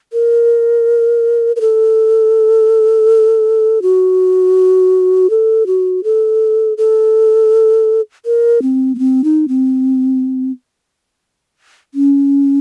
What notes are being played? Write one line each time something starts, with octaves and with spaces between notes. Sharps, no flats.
A#4
A#4
A4
F#4
A4
F#4
A4
A4
A#4
C4
A#3
C4
D#4
C4
C#4